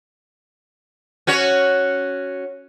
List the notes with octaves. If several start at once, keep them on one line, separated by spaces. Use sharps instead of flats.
C#4 F#4 C#5